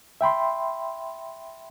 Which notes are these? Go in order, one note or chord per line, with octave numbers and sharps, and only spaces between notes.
E5 G5 B5 C6